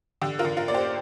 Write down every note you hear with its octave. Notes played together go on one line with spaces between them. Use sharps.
D3 G4
F4 A#4
D3
F4 A#4
A#3 D5
G4 C5